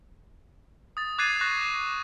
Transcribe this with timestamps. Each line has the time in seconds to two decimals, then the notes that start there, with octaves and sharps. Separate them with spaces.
0.97 D#6 A6
1.18 D6 F#6 G#6 A6 C7 D#7
1.41 C#6 F#6 A6 A#6